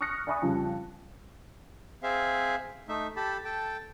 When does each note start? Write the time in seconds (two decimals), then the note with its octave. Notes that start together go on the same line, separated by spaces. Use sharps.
0.01 C#6 D#6 F6 F#6 A#6 C#7
0.27 D5 E5 G#5 B5 C#6 D#6
0.42 F2 C#3 G3
2.03 C4 G#4 E5 F5
2.88 A3 D#4 E5
3.16 G4 A4 A5 B5
3.45 A4 G5 A5